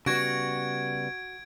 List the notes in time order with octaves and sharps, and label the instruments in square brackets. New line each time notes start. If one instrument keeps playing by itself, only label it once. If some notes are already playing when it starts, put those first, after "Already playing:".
[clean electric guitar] C#3 G3 B3 [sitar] F#4 [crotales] G#6 D7